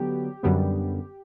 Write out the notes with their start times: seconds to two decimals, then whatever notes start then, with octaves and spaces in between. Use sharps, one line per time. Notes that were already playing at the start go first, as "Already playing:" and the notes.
Already playing: D3 F#3 B3 G4
0.43 F#2 D3 G3 B3